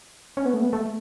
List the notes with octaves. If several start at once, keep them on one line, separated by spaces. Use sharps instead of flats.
C#4
B3
A3
B3
A3